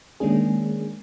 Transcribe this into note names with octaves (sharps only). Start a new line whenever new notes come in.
D#3 G#3 A#3 C#4 D4 G#4